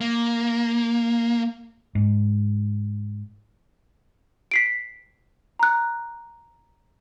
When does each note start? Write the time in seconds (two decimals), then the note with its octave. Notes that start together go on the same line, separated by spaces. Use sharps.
0.01 A#3
1.95 G#2
4.51 B6 C7 D7
5.59 A#5 F#6